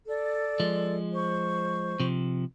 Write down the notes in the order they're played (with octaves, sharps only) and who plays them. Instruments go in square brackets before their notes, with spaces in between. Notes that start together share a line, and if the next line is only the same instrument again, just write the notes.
[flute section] A4 D5
[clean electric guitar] F3 G#3
[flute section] C5 C#6
[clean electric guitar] C3 F3